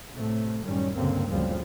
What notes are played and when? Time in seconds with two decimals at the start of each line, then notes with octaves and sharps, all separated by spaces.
0.14 A2 C3 A3
0.63 F#2 A2 D#3 G3 C#4
0.95 C#2 G2 A#2 D3 A#3 C4
1.28 F#1 D2 C#3 F3 G3